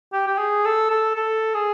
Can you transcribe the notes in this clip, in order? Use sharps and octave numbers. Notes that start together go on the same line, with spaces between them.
G4
G4
G#4
A4
A4
A4
G#4